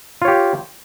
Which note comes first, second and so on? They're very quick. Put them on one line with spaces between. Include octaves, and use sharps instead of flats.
F4 C#5 G4